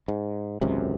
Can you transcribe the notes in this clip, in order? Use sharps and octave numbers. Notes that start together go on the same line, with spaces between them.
G#2
G#1 C#2 F#2 C3